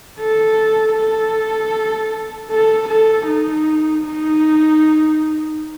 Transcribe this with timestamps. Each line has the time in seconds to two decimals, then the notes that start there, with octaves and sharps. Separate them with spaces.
0.20 A4
0.97 A4
2.51 A4
2.89 A4
3.27 D#4
4.04 D#4